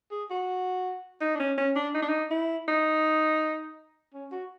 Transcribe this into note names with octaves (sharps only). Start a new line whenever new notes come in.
G#4
F#4
D#4
D4
C#4
C#4
D4
D#4
D4
D#4
E4
D#4
C#4
F#4